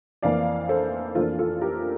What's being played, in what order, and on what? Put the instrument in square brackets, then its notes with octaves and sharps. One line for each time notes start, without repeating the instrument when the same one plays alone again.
[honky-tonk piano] F2 E3 A#3 D5 F5
A4 C5
F2 E3 A#3 D4 F4 A4
F4 A4
G4 A#4